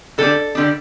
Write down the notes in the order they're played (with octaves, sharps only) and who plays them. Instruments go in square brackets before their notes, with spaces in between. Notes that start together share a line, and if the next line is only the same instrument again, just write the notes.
[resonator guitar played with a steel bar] D3 G3 D4 A4
D3 G3 D4